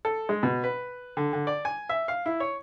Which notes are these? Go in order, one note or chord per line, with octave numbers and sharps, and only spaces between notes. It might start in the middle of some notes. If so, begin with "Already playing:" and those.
A4
G#3
B2
B4
D3
D3
D5
G#5
E5
F5
E4
C#5